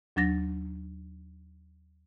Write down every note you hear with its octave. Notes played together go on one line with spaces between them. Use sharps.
D#2 F#3 D4 A6 A#6